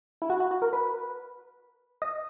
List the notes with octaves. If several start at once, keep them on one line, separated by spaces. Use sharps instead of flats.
E4
F#4
F#4
F#4
A#4
B4
D#5